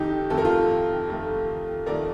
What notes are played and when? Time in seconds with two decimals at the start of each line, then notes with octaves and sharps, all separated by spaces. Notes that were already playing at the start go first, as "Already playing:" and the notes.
Already playing: F2 D#3 A3 D#4 G4 A4
0.30 F2 D#3 A3 A4
0.38 A#4
0.45 F4 A4
1.09 F2 D#3 A3
1.86 F2 D#3 A3 A#4 D5